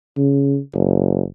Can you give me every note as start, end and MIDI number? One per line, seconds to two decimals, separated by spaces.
0.17 0.58 49
0.74 1.24 30